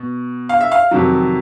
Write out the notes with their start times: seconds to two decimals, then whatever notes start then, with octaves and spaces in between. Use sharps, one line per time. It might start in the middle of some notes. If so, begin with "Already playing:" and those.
Already playing: B2
0.49 F5
0.61 E5
0.72 F5
0.91 F2 C3 D#3 F#3